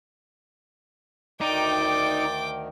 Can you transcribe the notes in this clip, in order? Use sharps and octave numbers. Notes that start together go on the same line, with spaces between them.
D2 D#3 D#4 D5 G5 D6